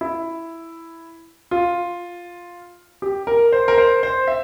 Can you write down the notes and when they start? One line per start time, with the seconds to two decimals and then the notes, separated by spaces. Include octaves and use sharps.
0.01 E4
1.51 F4
3.02 G4
3.27 A#4
3.52 C5
3.68 A#4
3.78 C5
4.03 C5
4.27 E5